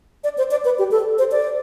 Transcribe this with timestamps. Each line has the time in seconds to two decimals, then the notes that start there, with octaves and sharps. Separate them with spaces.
0.24 D5
0.38 C5
0.51 D5
0.65 B4
0.79 G4
0.91 A4
1.18 C5
1.32 D5